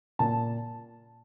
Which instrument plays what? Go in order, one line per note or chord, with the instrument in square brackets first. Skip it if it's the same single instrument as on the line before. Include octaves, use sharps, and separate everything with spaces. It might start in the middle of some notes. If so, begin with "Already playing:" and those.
[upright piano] A#2 A5